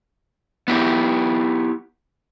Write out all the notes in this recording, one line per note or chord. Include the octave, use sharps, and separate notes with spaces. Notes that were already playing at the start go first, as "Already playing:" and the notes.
B3 E4 G4